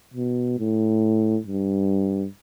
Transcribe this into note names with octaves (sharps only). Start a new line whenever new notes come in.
B2
A2
G2